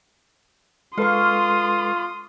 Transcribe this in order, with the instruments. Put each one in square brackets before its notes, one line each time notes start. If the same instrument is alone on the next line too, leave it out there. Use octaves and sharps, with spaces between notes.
[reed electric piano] G#3 A4 B4 [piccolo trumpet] F4 [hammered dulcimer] F5 C#6 [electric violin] C6 D#6